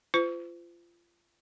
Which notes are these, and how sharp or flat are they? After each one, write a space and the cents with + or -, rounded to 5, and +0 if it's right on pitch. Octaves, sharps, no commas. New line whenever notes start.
F4 -25 C5 -40